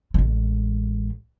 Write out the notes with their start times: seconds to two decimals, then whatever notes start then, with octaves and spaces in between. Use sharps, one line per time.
0.14 A1 G#3